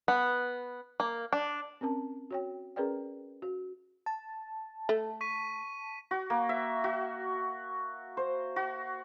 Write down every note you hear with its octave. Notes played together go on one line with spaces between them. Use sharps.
B3
A#3
D4
C4 C#4 A#4 A5
F#4 C#5 G5
C#4 G#4 A#4 B4 D5 G5
F#4
A5
A3
C#6 B6 D#7
F#4
A#3
E5
F#4
C5
F#4